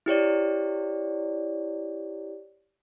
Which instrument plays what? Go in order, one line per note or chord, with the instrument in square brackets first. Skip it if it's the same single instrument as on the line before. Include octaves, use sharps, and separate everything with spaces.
[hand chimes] E4 G4 C#5 D5